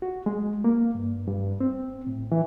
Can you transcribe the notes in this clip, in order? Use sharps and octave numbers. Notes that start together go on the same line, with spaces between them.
F#4
G#3
A#3
G2
G2
C4
A2
E3